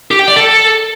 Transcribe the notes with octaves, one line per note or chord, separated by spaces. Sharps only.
G4
G5
D5
A4